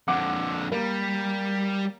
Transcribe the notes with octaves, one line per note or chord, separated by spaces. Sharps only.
F2 D3 F#5 D6
G3 A#3